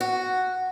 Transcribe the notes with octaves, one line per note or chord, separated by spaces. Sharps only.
F#4